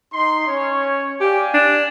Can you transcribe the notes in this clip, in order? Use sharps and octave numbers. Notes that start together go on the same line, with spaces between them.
D#4 C6
C#4 C#5
G4 D5 F5 G#5
D4